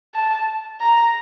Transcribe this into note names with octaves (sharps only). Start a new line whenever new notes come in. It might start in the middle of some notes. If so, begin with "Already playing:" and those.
A5
A#5